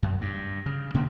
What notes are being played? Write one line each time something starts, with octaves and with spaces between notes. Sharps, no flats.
F#2
G2
C#3
B2 D3 A#3 C#4